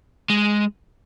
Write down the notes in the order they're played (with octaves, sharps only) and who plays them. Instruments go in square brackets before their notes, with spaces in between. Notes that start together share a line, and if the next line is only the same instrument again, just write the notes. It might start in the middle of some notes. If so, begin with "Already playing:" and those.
[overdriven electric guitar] G#3